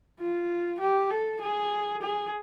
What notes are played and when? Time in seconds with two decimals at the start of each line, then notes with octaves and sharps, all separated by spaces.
0.20 F4
0.80 G4
1.10 A4
1.41 G#4
2.02 G#4